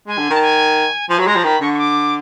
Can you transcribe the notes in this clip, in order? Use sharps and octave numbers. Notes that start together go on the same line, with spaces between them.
G#3 G#5
D3
D#3 A5
G#5
F3 G#5
F#3 B5
G#3 A#5
F3
D#3 B5
D3 C#6
C#6
D6